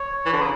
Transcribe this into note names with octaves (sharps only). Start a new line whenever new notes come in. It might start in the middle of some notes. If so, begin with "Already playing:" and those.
Already playing: C#5
E3
D3
C#3